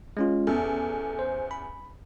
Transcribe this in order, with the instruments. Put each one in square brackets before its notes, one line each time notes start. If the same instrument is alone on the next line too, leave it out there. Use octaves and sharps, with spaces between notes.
[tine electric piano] G#3 C#4 F4
[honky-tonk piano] A1 E2 [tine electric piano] A4
[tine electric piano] C5
B5